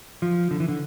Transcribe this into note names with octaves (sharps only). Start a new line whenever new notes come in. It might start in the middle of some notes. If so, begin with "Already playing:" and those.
F3
D3
E3
D3